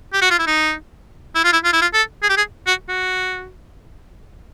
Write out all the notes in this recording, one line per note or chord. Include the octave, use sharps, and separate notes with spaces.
G4
F#4
F4
E4
D#4
E4
F4
E4
F4
E4
F4
A4
G#4
G4
G#4
F#4
F#4